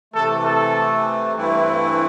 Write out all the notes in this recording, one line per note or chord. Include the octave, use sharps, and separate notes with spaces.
C3 E3 A3 A4
A4
G2 E3 A3 C4 E4